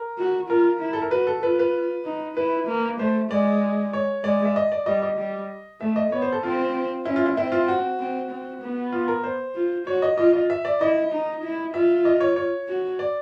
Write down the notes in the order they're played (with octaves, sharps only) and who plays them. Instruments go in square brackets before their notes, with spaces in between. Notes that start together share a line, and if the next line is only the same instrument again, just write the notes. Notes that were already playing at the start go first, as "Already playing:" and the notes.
Already playing: [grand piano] A#4
[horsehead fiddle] F#4
[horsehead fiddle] F4 [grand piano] A#4
[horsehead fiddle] E4
[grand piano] A4
A#4
[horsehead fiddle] F#4 [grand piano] B4
[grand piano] A4
[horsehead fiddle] F4 [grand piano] B4
[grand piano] B4
[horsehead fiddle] D#4
[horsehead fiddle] E4 [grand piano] B4
[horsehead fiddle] A#3
[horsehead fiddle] A3 [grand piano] C5
[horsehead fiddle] G#3 [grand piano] D5
[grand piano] C#5
[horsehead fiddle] G#3 [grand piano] D5
[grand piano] E5
D#5
D5
[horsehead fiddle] G3 [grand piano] D#5
[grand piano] D#5
[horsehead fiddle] G3
[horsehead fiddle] A3 [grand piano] E5
[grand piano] D#5
[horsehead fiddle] B3 [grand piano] C#5
[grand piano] C5
A4
[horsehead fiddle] C4 [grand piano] F4
[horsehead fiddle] C#4 [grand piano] E4
[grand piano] F4
E4
[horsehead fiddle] C4 [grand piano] E4
[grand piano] F4
F#4
[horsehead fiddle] C4
C4
B3
[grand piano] F4
A#4
C5
[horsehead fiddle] F4
[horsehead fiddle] F#4 [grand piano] C#5
[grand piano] D#5
[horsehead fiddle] F4 [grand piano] D#5
[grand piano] D#5
E5
D5
[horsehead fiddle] E4 [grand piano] D#5
[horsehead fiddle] D#4
E4
[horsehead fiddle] F4 [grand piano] E5
[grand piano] D#5
C#5
C#5
[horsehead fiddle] F#4
[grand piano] D5